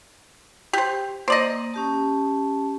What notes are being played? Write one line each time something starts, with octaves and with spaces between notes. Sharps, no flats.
G4 C5
A#3 C5 D5 D#5
C#4 G4 A5